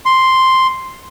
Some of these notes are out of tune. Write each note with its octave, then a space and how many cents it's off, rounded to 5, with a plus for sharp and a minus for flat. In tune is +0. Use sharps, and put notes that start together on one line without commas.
C6 +0